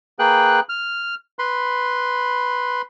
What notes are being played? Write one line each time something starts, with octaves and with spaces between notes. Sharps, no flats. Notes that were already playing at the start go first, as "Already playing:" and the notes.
A#3 G#4 B4 G5 F#6
F6
B4 B5 C6